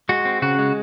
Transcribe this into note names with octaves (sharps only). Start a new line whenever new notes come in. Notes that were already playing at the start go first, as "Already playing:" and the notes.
G#3 F#4
C4
C#3 F#4
G#3